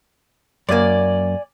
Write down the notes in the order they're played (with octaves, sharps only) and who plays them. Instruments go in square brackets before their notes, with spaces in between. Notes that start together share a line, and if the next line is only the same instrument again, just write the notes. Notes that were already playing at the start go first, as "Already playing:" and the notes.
[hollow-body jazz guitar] F#2 A#3 [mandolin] D5 G#5